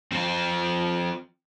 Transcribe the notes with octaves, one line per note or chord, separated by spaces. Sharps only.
F3 C4